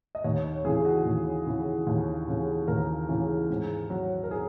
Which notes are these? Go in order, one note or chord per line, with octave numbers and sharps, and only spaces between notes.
D#5
D#2 C#5
C#5
C#3 E3 G#4
F#4
D#2
C#3 E3
D#2
C#3 E3
D#2 A#4
C#3 E3
G#2
F#3
A#4
G#4